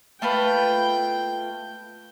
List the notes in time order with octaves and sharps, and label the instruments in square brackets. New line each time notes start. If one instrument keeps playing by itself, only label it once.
[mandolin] A3 F4 B4 [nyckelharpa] G5